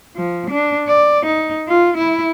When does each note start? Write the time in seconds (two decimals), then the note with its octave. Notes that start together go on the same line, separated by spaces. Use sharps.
0.16 F3
0.51 D4
0.88 D5
1.26 D#4
1.68 F4
1.97 E4